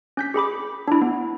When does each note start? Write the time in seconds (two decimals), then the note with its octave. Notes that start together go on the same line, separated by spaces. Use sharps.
0.17 C#4 G6 B6
0.34 G4 G#4 B5 D6
0.88 D4 E4
1.02 B3